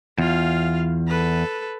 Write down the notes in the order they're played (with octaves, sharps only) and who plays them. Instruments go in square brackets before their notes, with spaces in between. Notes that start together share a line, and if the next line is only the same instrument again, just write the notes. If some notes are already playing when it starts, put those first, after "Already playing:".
[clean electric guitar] E2 [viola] F4 F5
[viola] A4 B4